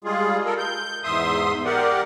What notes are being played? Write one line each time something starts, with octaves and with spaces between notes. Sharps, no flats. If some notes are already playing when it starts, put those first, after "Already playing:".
G3 G#3 F4 G#4
A4 A#4
G6
E2 G#2 E5 C6 D#6
G4 A#4 D5 F#5